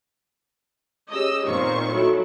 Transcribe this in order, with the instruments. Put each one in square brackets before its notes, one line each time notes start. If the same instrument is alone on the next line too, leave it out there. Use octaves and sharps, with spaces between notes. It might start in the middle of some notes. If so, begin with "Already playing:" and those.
[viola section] C#4 G4 G#4 [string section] D#5 E6
[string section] A#2 D#3 C#6 [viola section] B3 C4 C5
[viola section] F#3 E4 A4